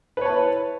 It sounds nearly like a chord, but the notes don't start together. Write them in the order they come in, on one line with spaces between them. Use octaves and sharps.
B4 C#5 A5 E4